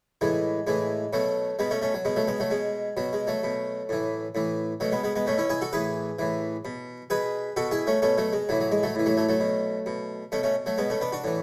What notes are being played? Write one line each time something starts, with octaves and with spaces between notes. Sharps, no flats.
A2 E3 G#3
A2 E3 G#3
B2 F#3 A3
B2 G#3 B3
A3 C#4
A3 C#4
F#3
B2 G#3
F#3 A3
G#3 B3
F#3 A3
B2 G#3
B2 F#3
G#3
F#3 A3
B2
A2 E3
A2 E3
B2 F#3 A3
G#3 B3
G#3 B3
G#3 B3
B2 A3 C#4
C#4 E4
E4 G#4
F#4 A4
A2 E3 G#4 B4
A2 E3
B2
B2 G#4 B4
B2 F#4 A4
E4 G#4
A3 C#4
B2 A3 C#4
F#3 A3
G#3
A2 E3 F#3
F#3
G#3
F#3 A3
A2 E3
F#3 A3
F#3 A3
F#3 A3
B2
B2
B2 A3 C#4
A3 C#4
F#3 A3
B2 G#3 B3
A3 C#4
B3 D4
D4 F#4
A2 E3